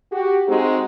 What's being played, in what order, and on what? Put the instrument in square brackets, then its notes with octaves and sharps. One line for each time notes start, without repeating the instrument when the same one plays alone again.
[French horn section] F#4 G4
G#3 C4 D#4 F#4 G#4